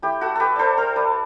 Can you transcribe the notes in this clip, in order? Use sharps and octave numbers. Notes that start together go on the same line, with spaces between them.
A3 E4 G4
F#4 A4
G4 A4 B4
A4 C5 D5
A4 C5
B4 D5